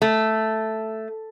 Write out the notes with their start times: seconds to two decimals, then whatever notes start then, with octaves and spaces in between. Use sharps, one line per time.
0.02 A3